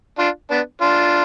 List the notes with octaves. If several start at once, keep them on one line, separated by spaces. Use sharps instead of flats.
D4 F4
B3 D4
D4 F4